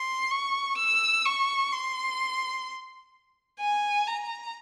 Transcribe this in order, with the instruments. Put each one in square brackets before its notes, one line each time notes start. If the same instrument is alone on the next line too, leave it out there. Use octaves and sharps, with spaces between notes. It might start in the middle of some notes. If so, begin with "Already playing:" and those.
Already playing: [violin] C6
C#6
E6
C#6
C6
G#5
A#5